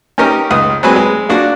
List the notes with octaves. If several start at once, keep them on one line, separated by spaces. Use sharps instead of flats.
C#4 D#4 G4 A#4
C#2 D#6
F#3 G#3 C4 B4 G#5
G#3
A#3 D4 F#4